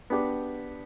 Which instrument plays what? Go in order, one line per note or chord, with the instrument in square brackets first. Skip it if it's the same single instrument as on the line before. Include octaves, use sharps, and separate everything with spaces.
[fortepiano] B3 D4 G4